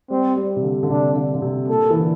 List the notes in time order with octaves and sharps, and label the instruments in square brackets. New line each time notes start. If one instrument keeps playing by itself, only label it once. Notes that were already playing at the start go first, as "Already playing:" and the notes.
[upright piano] G3 [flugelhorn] C4
[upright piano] G3
C3
D3
D3
[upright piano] C3 [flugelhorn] D4
[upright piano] D3
D3
C3
[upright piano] A#2 [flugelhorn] A4
[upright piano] E3
D3